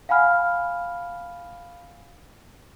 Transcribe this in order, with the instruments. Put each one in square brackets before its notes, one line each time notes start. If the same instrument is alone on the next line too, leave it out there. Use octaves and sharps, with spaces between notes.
[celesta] F5 F#5 G#5 B5 F6